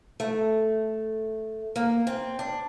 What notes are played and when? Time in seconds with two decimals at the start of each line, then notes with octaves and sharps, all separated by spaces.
0.20 A3
1.76 A#3
2.07 C4
2.39 D4